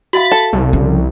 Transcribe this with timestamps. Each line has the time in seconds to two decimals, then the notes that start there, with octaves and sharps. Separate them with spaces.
0.13 F#4 E5 F5 B5 A6
0.32 A4
0.53 C2
0.73 C#3 F3